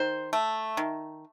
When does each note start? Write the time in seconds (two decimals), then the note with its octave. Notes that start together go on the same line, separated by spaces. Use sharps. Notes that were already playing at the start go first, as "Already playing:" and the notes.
Already playing: D#3 C5
0.33 A3
0.77 D#3